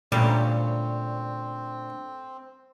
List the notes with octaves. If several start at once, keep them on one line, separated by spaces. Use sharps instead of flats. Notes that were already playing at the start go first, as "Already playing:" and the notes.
D2 A#2 G3 C4 C#4